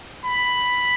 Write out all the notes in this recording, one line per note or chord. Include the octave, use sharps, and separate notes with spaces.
B5